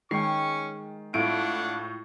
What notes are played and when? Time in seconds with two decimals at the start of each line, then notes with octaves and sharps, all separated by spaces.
0.11 D#3 G#3 C#4 G5 C#6 C7
1.14 A2 D4 E4 F4 F5 F#5 D7